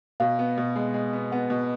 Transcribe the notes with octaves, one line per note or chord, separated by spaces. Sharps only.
B2 F5
B3
B2
G#3
G#3
B3
B3 F#5
B2